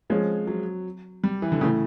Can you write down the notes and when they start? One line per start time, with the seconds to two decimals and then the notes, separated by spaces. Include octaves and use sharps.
0.10 F3 G#3 C4 C#4
0.47 F#3
1.24 G3
1.42 E3
1.52 D3
1.61 A2 C#3 E3 A3